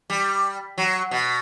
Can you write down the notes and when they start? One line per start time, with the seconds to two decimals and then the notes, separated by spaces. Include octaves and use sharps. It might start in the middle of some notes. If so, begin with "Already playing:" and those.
0.10 G3
0.78 F#3
1.11 B2